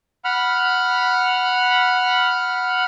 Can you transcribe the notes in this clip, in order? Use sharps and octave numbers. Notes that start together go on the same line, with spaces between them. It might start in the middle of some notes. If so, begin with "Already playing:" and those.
F#5 B5 F6